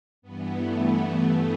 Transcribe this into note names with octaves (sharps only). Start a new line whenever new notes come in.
G2 E3 B3
A3
B3